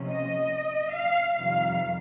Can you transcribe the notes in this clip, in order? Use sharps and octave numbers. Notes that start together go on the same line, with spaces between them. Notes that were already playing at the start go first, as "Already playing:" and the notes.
Already playing: C3 F3 A#3 C#4
D#5
F5
F2 C3 D#3 G3 F5